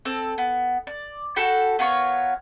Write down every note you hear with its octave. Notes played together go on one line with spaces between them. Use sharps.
C4 A4
B3
D5
F#4 A4 G5 B5
B3 F4 A#4 C#5